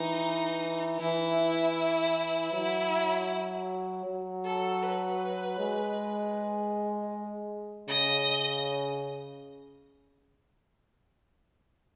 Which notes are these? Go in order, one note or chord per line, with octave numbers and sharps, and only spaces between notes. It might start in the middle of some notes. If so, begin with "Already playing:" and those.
Already playing: E3 D#4
E3 E4
F#3 E4
F#3
A4
B4
G#3
C#3 D#5